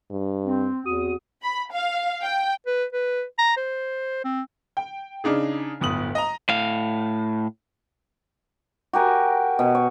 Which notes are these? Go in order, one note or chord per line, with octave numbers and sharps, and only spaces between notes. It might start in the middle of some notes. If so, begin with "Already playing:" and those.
G2
C4
E2 C4 F#4 D#6
B5
F5
G5
B4
B4
A#5
C5
C4
G5
C#3 D4 D#4 G#4
D1 G1 B3 D#6 F#7
D#5 A#5
A2 F5
F#4 G4 A#4 G#5
B2
C#5